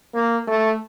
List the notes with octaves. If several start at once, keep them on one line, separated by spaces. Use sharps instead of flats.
A#3
A3